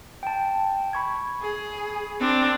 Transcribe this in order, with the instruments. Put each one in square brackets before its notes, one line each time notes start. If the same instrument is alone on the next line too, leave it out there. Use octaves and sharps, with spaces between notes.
[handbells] G5 A5
B5 C#6 G#6
[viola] G#4
C4 D4